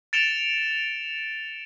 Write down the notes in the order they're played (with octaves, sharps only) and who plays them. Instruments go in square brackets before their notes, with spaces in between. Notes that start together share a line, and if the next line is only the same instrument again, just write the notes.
[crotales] A6 C#7 D7 E7 F7 G7